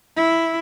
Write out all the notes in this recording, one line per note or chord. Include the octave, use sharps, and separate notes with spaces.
E4